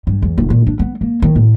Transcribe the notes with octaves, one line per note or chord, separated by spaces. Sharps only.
G2
E2
F1
A#2
D4
B3
A#3
D#3
A2